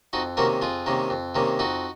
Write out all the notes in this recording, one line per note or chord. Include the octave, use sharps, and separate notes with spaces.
F2 D#4 F#4
C3 D#3 A#3 C#4 F#4 A#4
F2 F4 G#4
C3 D#3 A#3 C#4
F2
C3 D#3 A#3 C#4
F2 D#4 F#4